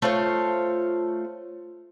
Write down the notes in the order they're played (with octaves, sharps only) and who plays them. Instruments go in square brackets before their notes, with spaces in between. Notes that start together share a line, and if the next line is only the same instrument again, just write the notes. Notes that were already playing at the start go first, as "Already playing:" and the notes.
[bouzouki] A3 F4 C5 C#5